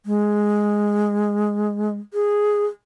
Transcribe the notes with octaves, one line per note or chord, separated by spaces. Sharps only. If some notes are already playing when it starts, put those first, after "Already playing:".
G#3
G#4